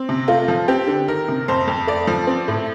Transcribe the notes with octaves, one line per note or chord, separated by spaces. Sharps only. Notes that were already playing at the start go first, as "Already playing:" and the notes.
Already playing: C4
C3
A3 F4
F3
C4 G4
D3
D#3 A#4
C3
F2 C5
F2
A3 D5
F3
C4
A2